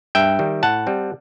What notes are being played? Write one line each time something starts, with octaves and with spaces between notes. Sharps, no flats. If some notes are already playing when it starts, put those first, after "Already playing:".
G2 E5 G5
D#3 G3 D#4
A2 F#5 A5
G3 C4